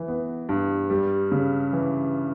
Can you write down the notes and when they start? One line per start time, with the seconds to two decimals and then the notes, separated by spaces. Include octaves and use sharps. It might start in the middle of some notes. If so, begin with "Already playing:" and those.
Already playing: E3
0.08 B3
0.49 G2
0.90 G3
1.32 C#3
1.73 E3